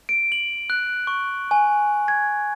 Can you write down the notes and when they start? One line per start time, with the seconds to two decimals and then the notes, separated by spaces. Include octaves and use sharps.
0.09 D7
0.32 F#7
0.70 F#6
1.07 C#6
1.51 G#5
2.08 G#6